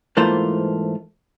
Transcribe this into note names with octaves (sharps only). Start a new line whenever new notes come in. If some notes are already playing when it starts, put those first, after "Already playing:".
G#2 E3 A3 A#3 F4 C5